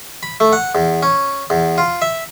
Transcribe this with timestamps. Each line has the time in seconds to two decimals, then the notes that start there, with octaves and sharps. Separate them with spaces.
0.23 B5
0.40 A3
0.53 F#5
0.75 E2
1.02 C#4
1.50 E2
1.78 F4
2.02 E5